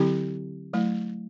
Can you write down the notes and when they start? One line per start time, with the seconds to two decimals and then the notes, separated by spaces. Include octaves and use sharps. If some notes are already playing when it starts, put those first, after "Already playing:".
Already playing: D3 F#3 C4 E4 G4
0.73 F#3 A3 E4